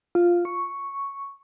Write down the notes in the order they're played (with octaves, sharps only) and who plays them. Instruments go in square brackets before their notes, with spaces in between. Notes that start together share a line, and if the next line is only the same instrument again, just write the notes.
[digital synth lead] F4
C#6